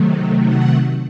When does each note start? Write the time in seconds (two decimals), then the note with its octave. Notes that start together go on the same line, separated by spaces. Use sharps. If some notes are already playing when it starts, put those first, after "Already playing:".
Already playing: C3 D#3 F#3 A3
0.47 F#5